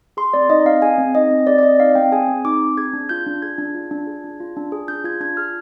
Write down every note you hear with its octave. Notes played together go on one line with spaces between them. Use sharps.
G#4 C6
C4 D5
D#4 D#5
C4 F5
G#4 G#5
C4
D#4 D#5
C4
G#4 D5
D5
C4 D#5
D#4 F5
C4 G5
G#4 G#5
C4
D#4 D6
C4
G#4 G#6
D4
F4 G6
D4
G#4 G#6
D4
F4
D4
G#4
D4
F4
D4
G#4
D4 G6
F4 G#6
D4 G#6
G#4 F6